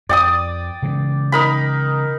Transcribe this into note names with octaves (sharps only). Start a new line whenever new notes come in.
F2 D5 G5 D#6
C#3 E3 G#3
D#4 A#4 B5